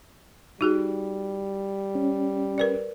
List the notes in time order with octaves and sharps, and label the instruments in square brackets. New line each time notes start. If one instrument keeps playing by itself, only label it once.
[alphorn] G3 [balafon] D#4 F#4 G#4
[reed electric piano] C#4
[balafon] A#4 B4 D5